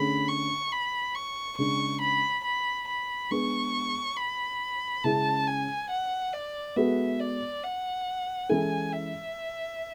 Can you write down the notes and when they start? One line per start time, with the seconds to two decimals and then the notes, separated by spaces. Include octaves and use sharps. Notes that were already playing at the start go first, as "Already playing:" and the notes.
Already playing: D3 A3 C#4 G#4 B5
0.29 C#6
0.72 B5
1.15 C#6
1.58 C#3 G#3 D4 C#6
2.02 B5
2.44 B5
2.88 B5
3.31 G#3 B3 D4 G#4 C#6
4.17 B5
5.04 C#3 G#3 C#4 E4 G#4 A5
5.47 G#5
5.90 F#5
6.33 D5
6.76 G#3 B3 F#4 A4 E5
7.20 D5
7.63 F#5
8.49 E3 G#3 C#4 E4 A4 G#5
8.93 E5